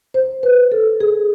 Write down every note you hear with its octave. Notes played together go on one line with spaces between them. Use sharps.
C5
B4
A4
G#4